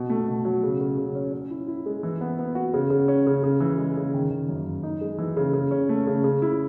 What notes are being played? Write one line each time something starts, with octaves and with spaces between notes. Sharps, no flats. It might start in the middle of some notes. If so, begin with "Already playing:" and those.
Already playing: B2
A3
B2
F#3
C#3
C#3
C#3
C#4
C#4
E4
E4
G#3
E3
B3
B3
F#4
C#3
C#3
C#4
C#3
C#3
E3
G#3
C#3
D#3
D#3
F#2
F#2
D#4
G#3
E3
C#3
C#3
C#4
A3
C#3
C#3
E4